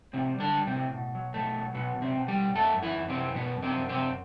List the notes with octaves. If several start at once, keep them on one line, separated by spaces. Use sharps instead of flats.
A2 C3 C4
G3
D3 D4
G3
C3 C4
A2
B2
F#3
B2 A3
F#3
B2 F#3 B3
B2
C3 C4
B2
G3 G4
B2
F#2 A3 A4
F#2
E3 E4
F#2
C3 C4
E3
F#2 B2 B3
F#2
C3 C4
F#2
C3 C4
F#2